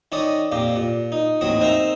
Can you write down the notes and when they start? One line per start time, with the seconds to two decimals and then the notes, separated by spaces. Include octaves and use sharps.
0.12 D#3 C#4 D5 D#5
0.52 F2 A#2 A#3 G4
0.76 A#2
1.12 D#4
1.41 A1 D#2 F#3 C4 D#5
1.60 C4 D#4 A#4 C5 E5 A#5